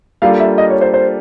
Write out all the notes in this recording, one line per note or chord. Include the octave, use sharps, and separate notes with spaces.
G3 A#3 D4 F4 A4 F5
E5
D#5
C#5
C5
C5